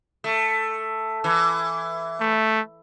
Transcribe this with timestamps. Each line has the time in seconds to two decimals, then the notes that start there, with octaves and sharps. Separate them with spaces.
0.24 A3
1.24 E3
2.20 A3